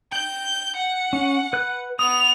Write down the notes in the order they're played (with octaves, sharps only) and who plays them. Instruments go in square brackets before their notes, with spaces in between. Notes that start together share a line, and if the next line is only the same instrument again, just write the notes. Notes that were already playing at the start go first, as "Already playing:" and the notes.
[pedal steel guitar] G5 [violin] G6
[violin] F#5
[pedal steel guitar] C#4
B4 F#6
[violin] B3 F7 [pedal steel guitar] D#6